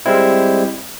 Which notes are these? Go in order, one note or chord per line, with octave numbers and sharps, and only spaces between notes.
G3 G#3 C4 E4